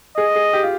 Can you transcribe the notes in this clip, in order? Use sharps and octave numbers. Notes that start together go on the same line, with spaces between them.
G#4 D#5
G#4
G4
F4